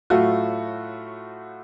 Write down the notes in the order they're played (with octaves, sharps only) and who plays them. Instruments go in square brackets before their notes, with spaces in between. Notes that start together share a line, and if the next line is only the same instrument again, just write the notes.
[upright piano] A2 F#3 A3 F4 F#4